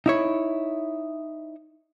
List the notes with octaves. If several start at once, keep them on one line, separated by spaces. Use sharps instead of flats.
D#4 E4 C#5